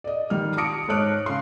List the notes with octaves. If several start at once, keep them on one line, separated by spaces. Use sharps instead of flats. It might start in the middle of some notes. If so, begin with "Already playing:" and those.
D5 D#5
D#3 G3 F6
A5 D6 D#6 A#6 C#7 D7
G#2 C#5 A5 F6 F#6 D7
C#3 C6